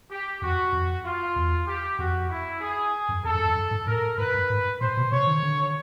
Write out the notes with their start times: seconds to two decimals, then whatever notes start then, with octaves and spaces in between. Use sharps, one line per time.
0.10 G4
0.41 F2 F#4
0.72 F2
1.04 F4
1.36 E2
1.67 G4
1.98 F2 F#4
2.29 E4
2.61 G#4
3.08 F#2
3.24 F2 A4
3.35 F#2
3.45 F2
3.55 F#2
3.71 G#2
3.86 A2 A#4
4.18 G#2 B4
4.34 G2
4.50 G#2
4.80 A#2 C5
4.97 B2
5.11 C3 C#5
5.27 D#3
5.43 D3